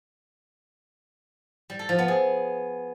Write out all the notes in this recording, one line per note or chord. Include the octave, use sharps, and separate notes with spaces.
G3
A4
F3
B3
G#4